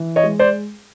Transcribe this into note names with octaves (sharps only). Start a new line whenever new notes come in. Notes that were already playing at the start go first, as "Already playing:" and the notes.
Already playing: E3
C#5 D#5
G#3
C5 D5